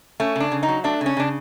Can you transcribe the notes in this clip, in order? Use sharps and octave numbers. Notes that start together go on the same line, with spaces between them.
A3 C#4
C#3 D4
C#3
D#4
F#3
A3 D4
C#3
C#4
C#3 D4